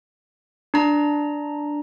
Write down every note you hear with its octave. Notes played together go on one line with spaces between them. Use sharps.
D4 A#5